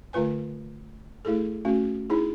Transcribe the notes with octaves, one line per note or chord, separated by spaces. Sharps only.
D3 A3 F4 B4 G#5
A3 E4 G#4 A4
A3 C#4 F#4
D#4 E4 G#4